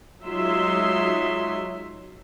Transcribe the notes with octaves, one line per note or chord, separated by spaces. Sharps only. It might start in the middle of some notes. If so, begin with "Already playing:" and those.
F#3 G#3 D#4 F4 E5 C6